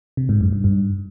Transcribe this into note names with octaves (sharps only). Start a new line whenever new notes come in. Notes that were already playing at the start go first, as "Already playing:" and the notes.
C3
G#2
F#2
G2
G2